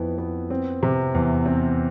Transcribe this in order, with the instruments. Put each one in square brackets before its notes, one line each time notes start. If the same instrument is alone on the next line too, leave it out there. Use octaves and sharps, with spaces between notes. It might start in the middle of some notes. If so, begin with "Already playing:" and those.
Already playing: [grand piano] F2 B3 E4
B3
C4
C3
E2
C4